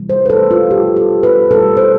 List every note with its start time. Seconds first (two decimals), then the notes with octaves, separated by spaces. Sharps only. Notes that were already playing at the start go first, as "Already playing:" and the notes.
Already playing: C3 E3 G3
0.10 C5
0.26 B4
0.30 A4
0.51 F4
0.71 B2 G3 G4
0.96 A4
1.23 B4
1.51 B2 G3 A4
1.77 C5